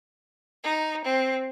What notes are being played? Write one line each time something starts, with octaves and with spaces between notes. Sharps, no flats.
D#4
C4